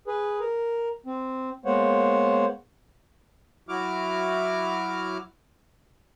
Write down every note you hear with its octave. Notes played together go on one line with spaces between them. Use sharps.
G#4 B4
A#4
C4
G#3 A#3 B3 C5 C#5 F#5
F#3 E4 F#4 D6 F6